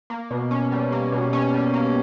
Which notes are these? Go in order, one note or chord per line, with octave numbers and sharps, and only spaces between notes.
A#3
B2
C#4
G3
A#3
B2
C#4
G3
A#3